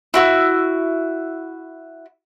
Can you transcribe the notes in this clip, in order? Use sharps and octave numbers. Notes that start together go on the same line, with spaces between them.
E4 F#4 E6